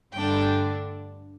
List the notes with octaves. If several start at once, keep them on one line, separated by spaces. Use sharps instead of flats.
G2 D3 A3 D4 G5